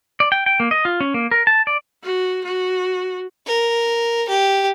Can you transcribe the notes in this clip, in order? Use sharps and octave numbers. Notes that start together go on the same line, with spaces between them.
D5
G5
G5
A#3
D#5
F4
C#4
A#3
A#4
A5
D5
F#4
F#4
A#4
G4